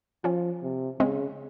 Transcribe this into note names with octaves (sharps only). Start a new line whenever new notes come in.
F3 C#4 F4
C3
C#3 G#3 C4